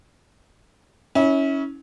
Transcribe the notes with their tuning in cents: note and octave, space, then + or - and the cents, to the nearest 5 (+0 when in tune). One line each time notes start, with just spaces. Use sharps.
C#4 +0 E4 -35